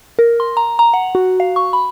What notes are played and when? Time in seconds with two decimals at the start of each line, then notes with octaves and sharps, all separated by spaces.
0.19 A#4
0.40 C6
0.57 A#5
0.79 A#5
0.94 F#5
1.15 F#4
1.40 F5
1.56 C#6
1.73 B5